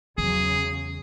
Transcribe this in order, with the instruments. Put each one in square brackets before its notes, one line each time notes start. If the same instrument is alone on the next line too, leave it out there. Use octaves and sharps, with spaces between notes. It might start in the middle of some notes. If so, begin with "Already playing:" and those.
[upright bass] E2 [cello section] C#3 F#3 [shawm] G#4